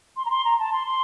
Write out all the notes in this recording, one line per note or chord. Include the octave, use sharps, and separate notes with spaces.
C6
A#5
C6
A#5
A5
C6
C6